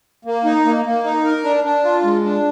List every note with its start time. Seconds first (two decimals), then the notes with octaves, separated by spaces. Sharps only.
0.25 A#3
0.45 D#4
0.65 A#3
0.85 A#3
1.04 D#4
1.25 A#4
1.44 D4
1.64 D4
1.84 F4
2.04 G#3
2.24 D4